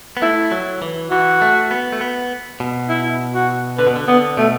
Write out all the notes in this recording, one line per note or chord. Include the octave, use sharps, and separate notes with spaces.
B3
A3 E4
F#3
E3
E3 F#4
A3
B3
A3
B3
B2
E4
F#4
D3 B4
B2
D3
D3 B3
B2 A3